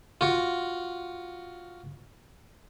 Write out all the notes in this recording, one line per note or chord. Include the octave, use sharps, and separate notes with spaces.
F4 F#4